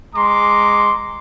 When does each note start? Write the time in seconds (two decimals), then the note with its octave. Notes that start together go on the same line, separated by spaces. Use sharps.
0.15 G#3 A#5 C6 D6